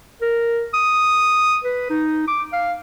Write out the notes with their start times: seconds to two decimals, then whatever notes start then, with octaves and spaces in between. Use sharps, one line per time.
0.22 A#4
0.74 D#6
1.65 B4
1.90 D#4
2.27 D6
2.53 F5